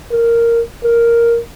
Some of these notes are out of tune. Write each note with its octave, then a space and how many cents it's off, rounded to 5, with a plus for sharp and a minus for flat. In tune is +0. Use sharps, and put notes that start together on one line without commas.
A#4 -5
A#4 +0